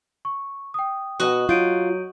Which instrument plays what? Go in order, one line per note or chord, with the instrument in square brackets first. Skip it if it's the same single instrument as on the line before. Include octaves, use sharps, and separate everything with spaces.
[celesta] C#6
G5 D#6
[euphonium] B2 [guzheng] F#4 D#5
[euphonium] F#3 [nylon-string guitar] F4 [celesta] G6 D7 D#7